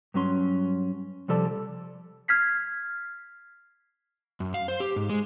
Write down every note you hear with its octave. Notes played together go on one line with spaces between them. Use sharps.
G2 F#3 C#4 C6
C3 F3 G3 A4 D5 A5
F6 G#6 B6 C7
F#2
F5
C5
G4
G#2
G#3